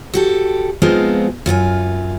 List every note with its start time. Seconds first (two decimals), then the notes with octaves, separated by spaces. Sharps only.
0.14 F#4 G4 A4
0.82 F3 G#3 B3 C4 D#4 F4
1.46 F#2 F4 A4 G#5